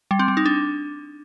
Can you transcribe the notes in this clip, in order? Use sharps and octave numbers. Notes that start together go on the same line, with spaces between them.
G3
C4
G3
D#4
D4